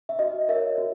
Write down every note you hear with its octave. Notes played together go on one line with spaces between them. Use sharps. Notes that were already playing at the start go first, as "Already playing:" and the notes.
E5
F#4 D#5
A#4 C#5 E5
F#4